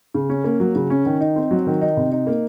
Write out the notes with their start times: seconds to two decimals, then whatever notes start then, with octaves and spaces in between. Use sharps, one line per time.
0.14 C#3
0.29 C#4
0.44 A#3
0.60 F#3
0.75 C#3
0.90 C#4
1.05 D#3
1.20 D#4
1.36 C4
1.51 F#3
1.67 D#3
1.81 D#4
1.97 C3
2.12 D#4
2.27 A#3